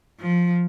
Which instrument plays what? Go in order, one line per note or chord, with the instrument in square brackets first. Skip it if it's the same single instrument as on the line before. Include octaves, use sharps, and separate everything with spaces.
[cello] F3